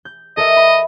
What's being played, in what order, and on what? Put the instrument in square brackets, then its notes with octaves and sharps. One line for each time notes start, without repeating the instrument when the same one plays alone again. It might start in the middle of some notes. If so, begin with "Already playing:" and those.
[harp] G6
[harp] A4 A#4 E5 [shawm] D#5
[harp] B5